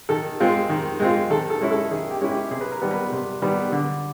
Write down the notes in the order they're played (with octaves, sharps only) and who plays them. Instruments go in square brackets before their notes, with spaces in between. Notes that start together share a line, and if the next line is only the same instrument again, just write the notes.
[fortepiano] D#3 A4
G#3 C4 F4
D#3
G#3 C4 F4
D#3 A4
A4
G#3 C#4 E4
A4
D#3 G#4
G4
G#3 C#4 E4
G4
C3 G#4
B4
A#4
D#3 G3 B3
B4
C3
D#3 G3 B3
D3